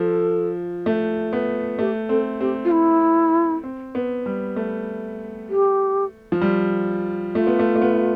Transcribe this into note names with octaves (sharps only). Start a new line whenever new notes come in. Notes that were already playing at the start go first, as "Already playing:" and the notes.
Already playing: F3 A4
A3
B3
A3 G4
C4 A4
C4 G4
F4
E4
C4
B3
G3
A3
G4
F3
G3
A3 F4
B3
A3
A3
B3